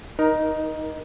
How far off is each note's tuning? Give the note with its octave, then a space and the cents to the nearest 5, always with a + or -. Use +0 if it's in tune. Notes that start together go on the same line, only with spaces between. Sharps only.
D#4 +0 A#4 +20